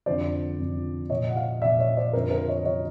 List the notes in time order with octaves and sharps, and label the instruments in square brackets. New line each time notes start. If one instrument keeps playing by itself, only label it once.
[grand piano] F2 D3 F3 C5 D5
F2 D3 F3
A#2 F3 C#5 D#5
F#5
D#5 F5
A#2 F3 D5 E5
C#5 D#5
C5 D5
F2 D3 F3 A#4 C5
A#4 C5
C#5 D#5
D3 F3 C#5 D#5